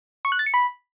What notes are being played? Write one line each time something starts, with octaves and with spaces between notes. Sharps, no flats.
C#6
F#6
A6
C#7
B5